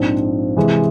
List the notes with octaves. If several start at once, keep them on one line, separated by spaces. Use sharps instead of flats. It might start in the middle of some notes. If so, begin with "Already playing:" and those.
Already playing: A#1 G#2 F3 C4
C3 E3 G#3